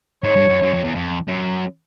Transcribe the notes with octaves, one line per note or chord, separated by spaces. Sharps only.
G#2 C#5
G2
F#2
F#2
F2
E2
F2
F#2